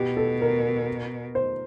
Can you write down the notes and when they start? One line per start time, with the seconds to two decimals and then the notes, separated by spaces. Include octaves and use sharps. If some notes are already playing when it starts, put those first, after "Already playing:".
Already playing: B2 G4
0.17 A4
0.41 A#4
1.35 C5